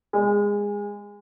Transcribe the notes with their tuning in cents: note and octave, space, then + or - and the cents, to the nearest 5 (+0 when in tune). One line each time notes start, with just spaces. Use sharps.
G#3 -20